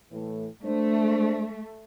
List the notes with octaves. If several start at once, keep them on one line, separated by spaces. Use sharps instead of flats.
A2 E3 A3
A3 D4 C5